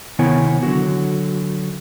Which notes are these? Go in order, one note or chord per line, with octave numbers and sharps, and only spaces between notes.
C3 D#3 B3 E4 C#5 G#5
D3 F#3 F#4